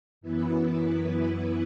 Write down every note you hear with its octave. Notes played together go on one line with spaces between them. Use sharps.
F#2 E3 B3 E4 B4